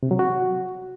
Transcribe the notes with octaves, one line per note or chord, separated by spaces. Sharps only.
C3
F#3
F#4